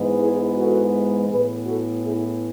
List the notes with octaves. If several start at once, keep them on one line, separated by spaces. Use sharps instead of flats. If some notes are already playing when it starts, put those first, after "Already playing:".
Already playing: G#2 E3 G#3 B3
E4 G#4
F#4 A4
A2 E3 B3 G#4 B4
F#4 A4
E4 G#4